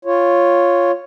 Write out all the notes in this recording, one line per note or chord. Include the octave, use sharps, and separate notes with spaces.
F4 C#5